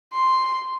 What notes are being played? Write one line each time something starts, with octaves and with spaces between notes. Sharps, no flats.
C6